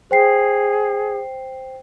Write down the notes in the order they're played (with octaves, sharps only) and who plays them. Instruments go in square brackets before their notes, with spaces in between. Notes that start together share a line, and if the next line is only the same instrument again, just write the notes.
[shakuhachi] G#4 [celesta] C5 G5 C7